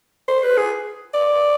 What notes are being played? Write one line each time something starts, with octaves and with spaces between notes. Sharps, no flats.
C5
B4
G#4
D5